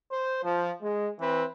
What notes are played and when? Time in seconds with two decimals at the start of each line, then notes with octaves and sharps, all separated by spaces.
0.12 C5
0.44 F3
0.82 G#3
1.20 E3 C4 B4